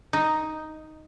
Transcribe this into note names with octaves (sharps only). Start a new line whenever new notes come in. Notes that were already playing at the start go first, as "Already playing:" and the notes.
D#4